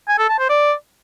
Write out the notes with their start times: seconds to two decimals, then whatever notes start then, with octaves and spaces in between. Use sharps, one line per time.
0.08 G#5
0.19 A4
0.29 A5
0.39 C5
0.49 D5